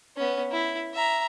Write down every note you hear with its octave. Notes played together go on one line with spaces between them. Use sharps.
B3 C#4
E4
E5 A#5